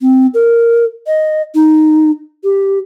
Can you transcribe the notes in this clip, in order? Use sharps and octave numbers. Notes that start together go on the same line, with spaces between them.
C4
A#4
D#5
D#4
G4